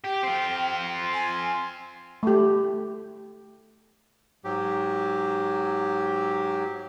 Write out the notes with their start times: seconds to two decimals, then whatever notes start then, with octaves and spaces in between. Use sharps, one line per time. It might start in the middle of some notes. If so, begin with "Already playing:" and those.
0.05 G4 G5
0.23 C4 F4
1.14 G#5
2.23 A3 G4
4.44 G#2 F#3 G4